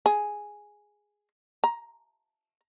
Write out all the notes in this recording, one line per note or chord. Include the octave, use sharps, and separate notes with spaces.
G#4
A#5